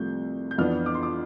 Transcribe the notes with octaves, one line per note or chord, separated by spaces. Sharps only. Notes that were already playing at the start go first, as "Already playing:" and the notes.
Already playing: C2 C3 F3 A3 G6
G6
F2 E3 B3 D4 F6
D6
C6
D6